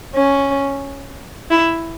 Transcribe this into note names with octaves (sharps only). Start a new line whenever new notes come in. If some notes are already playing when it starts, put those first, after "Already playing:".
C#4
E4